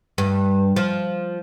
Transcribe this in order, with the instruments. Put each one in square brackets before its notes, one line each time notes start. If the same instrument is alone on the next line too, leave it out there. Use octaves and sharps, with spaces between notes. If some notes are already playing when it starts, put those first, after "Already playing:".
[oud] G2
F3